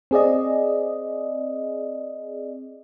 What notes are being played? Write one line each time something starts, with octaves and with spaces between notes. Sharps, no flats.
C4 G#4 D5 D#5